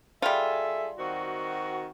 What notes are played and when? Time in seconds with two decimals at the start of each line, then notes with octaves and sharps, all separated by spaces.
0.22 G3 F4 G#4 A4 E5
0.98 D#3 C4 F#4